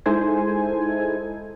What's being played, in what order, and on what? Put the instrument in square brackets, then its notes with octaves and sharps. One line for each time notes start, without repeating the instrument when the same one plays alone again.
[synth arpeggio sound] G#3 D#4 E4 A4 C5 G#5